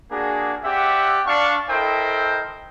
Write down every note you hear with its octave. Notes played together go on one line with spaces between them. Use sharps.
A#3 D4 F#4 G#4
C4 G4 D5 E5 F#5
D4 F5 C#6
E4 A4 A#4 C5 D#5 G5